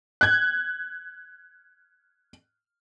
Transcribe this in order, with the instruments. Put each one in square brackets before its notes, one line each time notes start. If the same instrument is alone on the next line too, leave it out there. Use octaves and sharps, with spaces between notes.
[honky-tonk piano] F#6 G#6